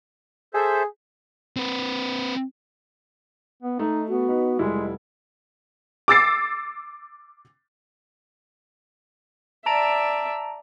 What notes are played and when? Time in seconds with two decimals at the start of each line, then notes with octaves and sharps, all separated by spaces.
0.54 G#4 A4 C5 E5
1.56 C4 B4
3.63 B3
3.79 A3 D#4
4.09 B3 F#4
4.29 D#4 B4
4.59 F1 G3 G#3 E4
6.08 D6 E6 A6 C7
9.66 D5 E5 A5 A#5 D7